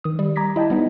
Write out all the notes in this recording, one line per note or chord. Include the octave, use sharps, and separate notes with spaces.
D#3 D#6
G3
A#5 D6 G#6 A#6 B6
E4 D#5 G5 A5
G3 B3 D#4